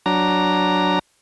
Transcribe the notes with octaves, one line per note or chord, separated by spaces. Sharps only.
F#3 D4 A#5